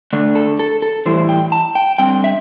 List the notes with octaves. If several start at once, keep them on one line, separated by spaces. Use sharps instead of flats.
D3 A3 D4
A4
A4
A4
A2 E3 G3 E4 C5
G5
A5
G5
D3 G3 C4 G5
E5